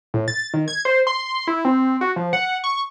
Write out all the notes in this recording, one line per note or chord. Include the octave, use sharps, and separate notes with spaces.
A2
A6
D#3
G#6
C5
C6
E4
C4
F#4
F3
F#5
C#6